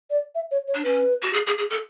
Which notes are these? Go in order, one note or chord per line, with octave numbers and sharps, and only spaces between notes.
D5
E5
C#5
C#5
D4
C#4 B4
F#4
G#4
G#4
G#4
A4